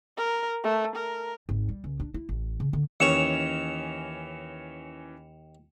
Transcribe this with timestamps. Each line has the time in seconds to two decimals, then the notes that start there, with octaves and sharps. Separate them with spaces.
0.17 A#4
0.64 A3
0.95 A#4
1.49 G#1
1.69 G3
1.84 C#2
2.00 D4
2.14 E4
2.29 A1
2.60 C#3
2.73 D3
3.00 D#2 E3 C#4 C#5 D#5 C#7 E7 F7